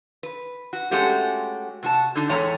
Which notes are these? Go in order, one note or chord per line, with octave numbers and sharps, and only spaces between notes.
B4
F#4
G#3 A3 C#4 F#4 G4
C3 F#4 A5
D3 D#4
E2 A2 G#3 A3 C#5 A#5